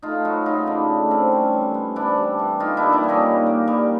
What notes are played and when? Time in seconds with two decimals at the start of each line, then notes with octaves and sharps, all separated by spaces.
0.02 A3 D#4 F4
0.25 F#3 E4 F#4
0.45 C#3 D#4 F4
0.67 C#3 D4 E4
0.89 A3
1.11 F#3 C4
1.32 G3 C#4
1.53 E3
1.74 B3
1.96 C3 D4 E4
2.18 G3
2.39 E3
2.60 A#3 D#4 F4
2.77 D4 E4
2.82 G3
2.92 D4 E4
3.03 A#2
3.09 C#4 D#4
3.25 A#2
3.47 A#3
3.68 G3